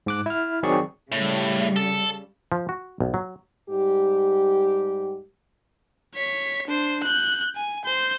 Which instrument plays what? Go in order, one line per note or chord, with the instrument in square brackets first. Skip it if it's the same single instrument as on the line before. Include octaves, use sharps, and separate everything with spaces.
[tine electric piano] G#2 D6 F#6
E4 F6
D#3 F#3 C4 G#4 D5 C#6
[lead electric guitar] A2 [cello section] C#3 G3
[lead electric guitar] A4
[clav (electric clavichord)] F3
F#4
B1
F#3
[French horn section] G#2 G3 G4
[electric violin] C#5 B6
D4 C5
F#6 G6
G#5
C5 G6